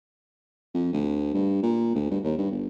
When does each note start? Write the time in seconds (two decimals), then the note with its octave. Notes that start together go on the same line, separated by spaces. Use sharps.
0.74 F2
0.93 D2
1.34 G2
1.63 A#2
1.95 D2
2.10 G2
2.23 D#2
2.38 G2
2.51 G1